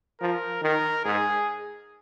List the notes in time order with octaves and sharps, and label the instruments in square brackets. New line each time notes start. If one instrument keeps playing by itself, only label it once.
[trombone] F3 [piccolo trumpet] A#4
[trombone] D#3 [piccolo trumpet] A#4
[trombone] G#2 [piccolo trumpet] G#4